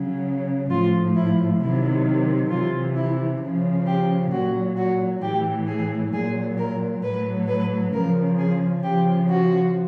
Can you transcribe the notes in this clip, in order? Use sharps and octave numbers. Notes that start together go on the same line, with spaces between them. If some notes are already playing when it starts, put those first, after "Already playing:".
Already playing: C#3 F#3
A2 F3 F4
E4
C3 D#3 F#3 E4
C3 E3 F4
E4
C#3 F3
G4
A#2 F#3 F#4
F#4
A2 E3 G4
G#4
A#2 F#3 G#4
A#4
A2 F#3 B4
B4
C#3 F3 A#4
G#4
C#3 F3 G4
F#4